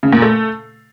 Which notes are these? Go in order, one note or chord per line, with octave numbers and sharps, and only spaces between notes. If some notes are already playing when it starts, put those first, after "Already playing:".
C#3
A#2
A3